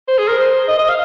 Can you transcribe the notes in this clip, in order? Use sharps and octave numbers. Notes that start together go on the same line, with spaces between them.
C5
G#4
A#4
C5
D#5
D#5
F5